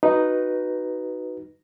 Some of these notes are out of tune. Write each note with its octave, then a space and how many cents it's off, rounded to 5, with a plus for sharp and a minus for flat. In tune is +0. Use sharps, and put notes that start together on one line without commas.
D#4 +0 F#4 +5 B4 -5